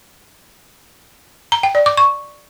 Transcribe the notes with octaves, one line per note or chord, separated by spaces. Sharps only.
A#5
G5
D5
D6
C#6